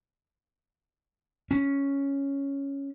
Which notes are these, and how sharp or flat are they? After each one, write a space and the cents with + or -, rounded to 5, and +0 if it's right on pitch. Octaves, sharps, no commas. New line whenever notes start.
C#4 +0